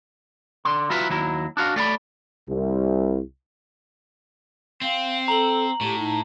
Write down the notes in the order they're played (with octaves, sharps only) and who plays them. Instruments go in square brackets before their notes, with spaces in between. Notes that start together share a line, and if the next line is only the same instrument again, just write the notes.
[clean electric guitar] D3 C6
F#3 E4 F4 B4
D#2 F#3 E4
D4 F#4 F5
A3 D5 F5 B5
[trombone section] C2
[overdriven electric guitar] C4 [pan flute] F5
[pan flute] A4 [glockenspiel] A#5 F#7
[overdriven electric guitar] A2 [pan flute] G4
[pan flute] D#4